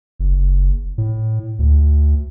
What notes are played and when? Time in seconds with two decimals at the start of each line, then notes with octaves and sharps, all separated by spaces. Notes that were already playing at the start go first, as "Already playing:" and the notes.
0.20 F#1
0.98 A2
1.59 D2